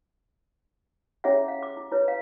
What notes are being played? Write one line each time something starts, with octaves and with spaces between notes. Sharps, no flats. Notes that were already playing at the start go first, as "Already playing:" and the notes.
C#4 E4 G#4 C#5 E5 F#5
F5
D6
E4
E4 B4 C#5
F5